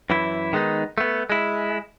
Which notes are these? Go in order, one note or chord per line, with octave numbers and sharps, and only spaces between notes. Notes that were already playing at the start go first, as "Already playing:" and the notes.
F#2 E3 E4
D#3 G#3 B3 D#4
A3 B3
G#3 E4